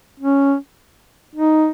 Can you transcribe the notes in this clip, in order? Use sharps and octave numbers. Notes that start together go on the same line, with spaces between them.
C#4
D#4